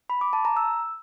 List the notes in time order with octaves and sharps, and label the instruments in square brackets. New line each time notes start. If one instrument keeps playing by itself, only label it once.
[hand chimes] B5
D6
A5
A#5
E6